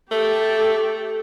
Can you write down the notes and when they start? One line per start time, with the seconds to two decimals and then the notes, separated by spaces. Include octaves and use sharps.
0.12 A3 G4 A4